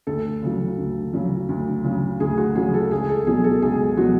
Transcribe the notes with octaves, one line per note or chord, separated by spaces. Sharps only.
D2 A4
C#3 F#3
D2
C#3 F#3
D2
C#3 F#3
D2 G#4
F#4
C#3 F#3 G#4
A4
C#2 G#4
A4
B2 F#3 G#4
A4
C#2 G#4
B2 F#3 F#4